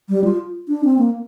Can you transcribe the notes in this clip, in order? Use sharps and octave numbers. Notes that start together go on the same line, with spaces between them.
G3
F4
D4
C4
A#3